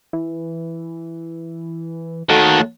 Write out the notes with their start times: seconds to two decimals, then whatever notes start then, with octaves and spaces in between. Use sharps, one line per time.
0.13 E3
2.30 D#2 D#3 A3 F#4 A4